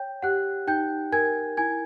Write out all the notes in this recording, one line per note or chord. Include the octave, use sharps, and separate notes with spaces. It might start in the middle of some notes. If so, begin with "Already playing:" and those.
Already playing: C#5 G5 G6
G4 F#5 F#6
D#4 G5 G6
A#4 G#5 G#6
E4 G#5 G#6